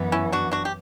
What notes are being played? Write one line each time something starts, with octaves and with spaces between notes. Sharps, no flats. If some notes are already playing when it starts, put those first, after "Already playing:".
Already playing: F#2 E3 B3
C#4 E4
D4 F#4
D4 F#4
G4